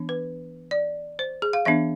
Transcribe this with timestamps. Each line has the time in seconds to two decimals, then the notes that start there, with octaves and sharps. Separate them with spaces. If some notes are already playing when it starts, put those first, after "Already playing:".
Already playing: E3 B3 D4
0.09 B4
0.71 D5
1.19 C5
1.42 G#4
1.53 F5
1.65 E3 B3 D4 E5